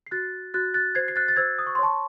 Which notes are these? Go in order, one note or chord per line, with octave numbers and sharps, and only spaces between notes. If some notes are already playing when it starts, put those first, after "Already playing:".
C7
F#4 F#6 A6
F#4 F#6 A6
F#6 A6
C5 G#6 C7
C7
F#6 A6
A6
C5 E6 G#6
D#6
C#6
C6
C#5 A5 C#6